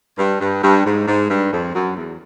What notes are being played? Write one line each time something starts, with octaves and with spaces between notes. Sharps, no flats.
G2
G2
G2
G#2
G#2
G2
F2
F#2
E2